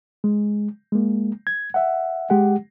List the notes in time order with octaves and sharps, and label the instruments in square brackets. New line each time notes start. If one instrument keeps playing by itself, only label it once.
[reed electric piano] G#3
G#3 A#3
G#6
E5 F#5
G#3 G4 F#5